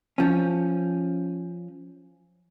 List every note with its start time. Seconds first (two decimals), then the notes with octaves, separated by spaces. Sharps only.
0.18 F3 C#4